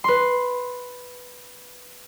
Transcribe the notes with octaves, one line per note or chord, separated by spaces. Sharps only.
B4 C6